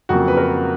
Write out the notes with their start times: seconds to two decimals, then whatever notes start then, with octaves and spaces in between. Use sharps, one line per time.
0.09 F2 C#3 F#3 A#3 F#4
0.28 B4
0.37 A#4